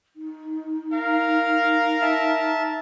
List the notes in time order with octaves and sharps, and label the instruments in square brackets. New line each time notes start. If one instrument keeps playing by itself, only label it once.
[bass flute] D#4
[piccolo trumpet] A#4 [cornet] F5
[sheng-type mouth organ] E5 A5